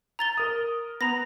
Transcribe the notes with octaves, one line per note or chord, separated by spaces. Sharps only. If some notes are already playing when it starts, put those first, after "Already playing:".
A#5 A6 G7
A#4 D#6
B3 A#5 B5 A#6